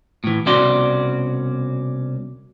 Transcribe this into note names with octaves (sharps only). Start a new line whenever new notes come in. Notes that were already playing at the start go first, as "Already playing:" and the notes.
A2 E3
C2 B2 C#4 F#4 D5 C6